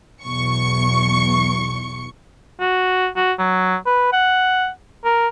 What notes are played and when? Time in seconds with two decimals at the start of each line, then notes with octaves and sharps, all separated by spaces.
0.23 B1 E2 C#6 C#7
2.60 F#4
3.17 F#4
3.39 F#3
3.86 B4
4.13 F#5
5.05 A#4